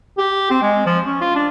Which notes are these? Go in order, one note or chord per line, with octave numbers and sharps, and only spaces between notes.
G4
C4
G#3
F3
C#4
F4
D4